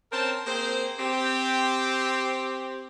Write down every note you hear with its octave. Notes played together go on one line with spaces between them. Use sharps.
C4 C#4 A#4 C5 A5
A#3 C4 G#4 C5
C4 G4